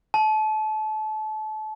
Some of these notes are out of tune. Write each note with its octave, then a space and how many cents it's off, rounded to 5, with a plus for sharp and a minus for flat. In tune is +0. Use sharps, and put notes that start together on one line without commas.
A5 -30